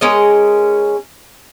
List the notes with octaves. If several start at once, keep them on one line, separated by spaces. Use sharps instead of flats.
G#3 C#4 A#4 D#5